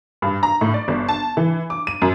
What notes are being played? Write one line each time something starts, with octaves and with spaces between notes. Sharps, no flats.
G2
A#5
A2
D5
G1
A5
E3
D6
D#7
F#2